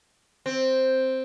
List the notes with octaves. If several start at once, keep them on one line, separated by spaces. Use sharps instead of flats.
C4